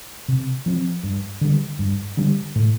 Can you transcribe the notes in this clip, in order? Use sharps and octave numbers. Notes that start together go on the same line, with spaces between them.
C3
F3 C4
G2
D3 G3
G2
D3 G3
A2